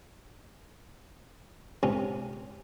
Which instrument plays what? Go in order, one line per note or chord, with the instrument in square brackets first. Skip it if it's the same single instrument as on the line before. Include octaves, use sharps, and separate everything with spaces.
[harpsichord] C#2 C3 C#4